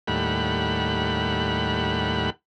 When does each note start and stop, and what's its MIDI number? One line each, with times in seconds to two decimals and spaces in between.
0.07 2.30 39
0.07 2.30 45
0.07 2.30 55
0.07 2.30 78
0.07 2.30 83